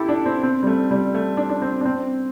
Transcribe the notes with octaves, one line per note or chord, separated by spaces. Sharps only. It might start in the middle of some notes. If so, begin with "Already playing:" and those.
Already playing: E4 G4 A4
D4
C4
C4
G3
A3
G3
A3
D4
D4
C4
D4
C4